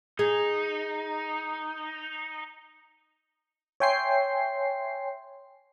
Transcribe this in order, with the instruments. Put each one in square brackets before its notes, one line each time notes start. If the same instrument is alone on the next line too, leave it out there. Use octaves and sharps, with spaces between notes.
[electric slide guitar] D#4 [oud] G#4
[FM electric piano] C#5 E5 G5 G#5 C6 C7